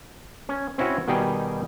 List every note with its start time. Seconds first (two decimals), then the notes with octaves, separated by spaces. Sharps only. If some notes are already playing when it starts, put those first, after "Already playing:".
0.49 C#4
0.78 C4 C#4 E4 F#4 C#5
1.08 B2 D#3 G3 D#4 G#4 G5